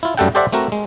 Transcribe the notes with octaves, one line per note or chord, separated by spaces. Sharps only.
E4 F4
F#2 G3 A3 A4 F#5 G5
G4 A4 C5 D5 E5 F#5
A3 C4 F#4 A#4
G#3